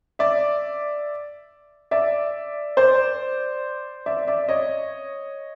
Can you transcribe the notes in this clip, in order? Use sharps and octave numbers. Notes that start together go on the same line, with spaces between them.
D5 E5
D5 E5
C5 D5
D5 E5
D5 E5
C#5 D#5